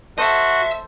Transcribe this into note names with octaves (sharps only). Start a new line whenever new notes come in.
F#4 A4 C5 D#5 E5